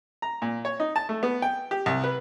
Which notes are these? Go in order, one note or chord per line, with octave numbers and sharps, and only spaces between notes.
A#5
A#2
C#5
D#4
A5
A3
B3
G5
G4
C2
B4